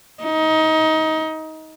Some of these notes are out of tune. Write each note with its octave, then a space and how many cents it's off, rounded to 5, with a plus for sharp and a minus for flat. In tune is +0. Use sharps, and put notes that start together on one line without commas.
D#4 +20